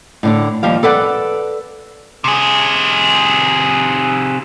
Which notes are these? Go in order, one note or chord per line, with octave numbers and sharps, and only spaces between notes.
A2 D3 D4
D#2 F3 G3 F5
A4 B4 D5 F#5
C3 G#4